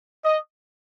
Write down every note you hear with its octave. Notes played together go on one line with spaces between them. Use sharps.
D#5